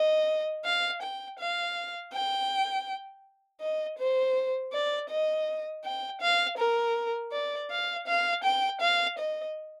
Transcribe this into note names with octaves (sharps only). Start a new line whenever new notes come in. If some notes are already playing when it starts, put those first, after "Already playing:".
Already playing: D#5
F5
G5
F5
G5
D#5
C5
D5
D#5
G5
F5
A#4
D5
F5
F5
G5
F5
D#5